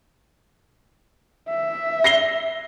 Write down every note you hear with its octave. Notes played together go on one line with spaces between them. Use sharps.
E5
A#6 C7 G7